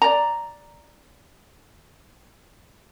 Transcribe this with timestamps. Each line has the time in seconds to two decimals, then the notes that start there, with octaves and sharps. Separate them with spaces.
0.02 D5 A#5